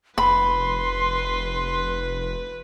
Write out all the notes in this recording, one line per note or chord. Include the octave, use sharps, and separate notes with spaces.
F1 B4 B5 C6